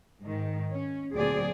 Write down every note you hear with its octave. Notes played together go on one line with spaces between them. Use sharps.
G#2 D#3
C#4
D2 A#2 F#3 C4 G#4 D5